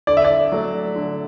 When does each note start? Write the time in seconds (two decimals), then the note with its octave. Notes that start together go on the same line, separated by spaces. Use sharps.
0.07 D3 D5
0.17 E5
0.25 D5
0.52 F#3 A3
0.96 D3